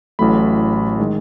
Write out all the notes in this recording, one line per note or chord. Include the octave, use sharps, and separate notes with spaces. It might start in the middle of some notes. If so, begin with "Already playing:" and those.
A1 A2 F#3 A3 B5
D#3 G#3